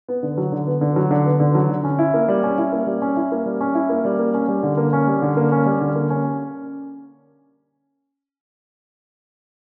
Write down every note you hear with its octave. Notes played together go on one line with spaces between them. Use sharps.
B3
D3
F#3
D3
B3
D3
F#3
D3
B3
D3
F#3
D3
C#4
E4
A#3
G3
C#4
E4
A#3
G3
C#4
E4
A#3
G3
C#4
E4
A#3
G3
A#3
C#4
G3
D3
A#3
C#4
G3
D3
A#3
C#4
G3
D3
A#3
C#4